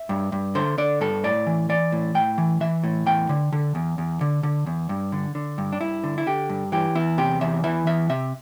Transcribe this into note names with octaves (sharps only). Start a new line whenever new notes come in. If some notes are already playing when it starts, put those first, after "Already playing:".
Already playing: E5
G2
G2
D3 C5
D3 D5
G2 A4
A2 D5
E3
E3 D5
A2
A2 G5
E3
E3 E5
A2
E2 G5
D3
D3
E2
E2
D3
D3
E2
G2
D3
D3
G2
D4
G2 E4
D3
E4
D3 G4
G2
E3 G4
E2 E4
C3 G4
E2 E5
E3 E5
E2 E5
C3 E5